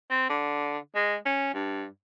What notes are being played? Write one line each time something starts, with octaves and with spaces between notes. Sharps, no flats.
C4
D3
G#3
C#4
G2